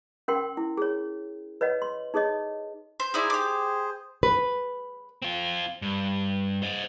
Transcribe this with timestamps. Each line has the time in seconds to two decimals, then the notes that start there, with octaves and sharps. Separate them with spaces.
0.28 C#4 A#4 F#5 G5 C6
0.57 E4
0.77 G#4 C#5
1.61 B4 C#5 D#5 F#5
1.82 C6
2.14 D#4 G#4 A4 C#5 D#5
3.00 C5
3.14 D#4 E4 G#4 C5 D5
3.30 G4 D6
4.23 B4
5.22 C4 F4
5.82 G2
6.63 C5 D#5